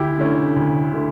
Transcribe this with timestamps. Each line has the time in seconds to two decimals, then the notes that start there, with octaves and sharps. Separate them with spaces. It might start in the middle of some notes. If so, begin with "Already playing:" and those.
Already playing: D2 E4 G4
0.18 D3 A3 C#4
0.56 D2
0.93 D3 A3